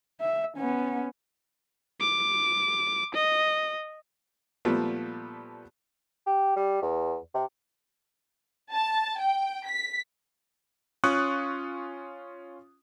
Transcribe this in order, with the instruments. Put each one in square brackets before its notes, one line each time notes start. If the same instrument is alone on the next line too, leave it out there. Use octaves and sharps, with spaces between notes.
[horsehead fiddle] E5
B3 C#4
[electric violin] D6
D#5
[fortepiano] A#2 F3 G3 A3 B3
[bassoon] G4
G3
E2
C3
[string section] A5
G5
B6
[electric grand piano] C#4 F4 C#6 D#6 F#6